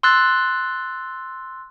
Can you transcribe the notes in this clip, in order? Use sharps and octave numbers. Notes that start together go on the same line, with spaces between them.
C6 E6 F#6 A6